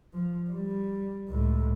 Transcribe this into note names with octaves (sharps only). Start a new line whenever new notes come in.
F3
G3
C#2 A2